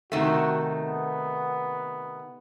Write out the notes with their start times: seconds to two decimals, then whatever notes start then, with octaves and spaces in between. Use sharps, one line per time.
0.12 C3 D#3 A3 F#4
0.75 B3